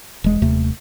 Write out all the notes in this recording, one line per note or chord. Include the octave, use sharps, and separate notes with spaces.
E1 G#3
D#1 D#2 C3 A3